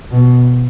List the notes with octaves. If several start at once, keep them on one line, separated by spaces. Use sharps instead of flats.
B2